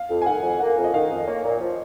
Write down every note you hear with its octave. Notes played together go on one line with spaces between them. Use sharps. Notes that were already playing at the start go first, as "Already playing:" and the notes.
Already playing: F5
F2
G#5
D#3 F#5
F2
A#3 F#5
F2
D#5
D#3 F5
F2
A#3 C#5
A#2
D#5
F3